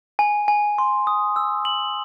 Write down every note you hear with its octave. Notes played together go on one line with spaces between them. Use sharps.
G#5
G#5
C6
D#6
E6
F#7